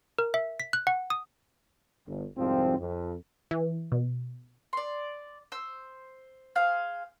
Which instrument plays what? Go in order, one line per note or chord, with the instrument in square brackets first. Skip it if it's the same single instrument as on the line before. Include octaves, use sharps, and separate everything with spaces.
[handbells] A#4
E5
B6
F#6
F#5
D#6
[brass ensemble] G1
C2 F2 G#2 F3 C4
F2
[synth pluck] E3
B2
[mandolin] D5 C6
C5 E6
G#4 C5 F5